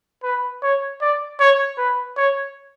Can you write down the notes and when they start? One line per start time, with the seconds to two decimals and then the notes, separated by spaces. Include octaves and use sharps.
0.23 B4
0.62 C#5
1.01 D5
1.40 C#5
1.78 B4
2.17 C#5